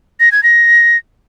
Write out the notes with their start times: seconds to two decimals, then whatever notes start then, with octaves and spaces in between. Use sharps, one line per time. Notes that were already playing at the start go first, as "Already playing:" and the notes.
0.20 A#6
0.32 G#6
0.43 A#6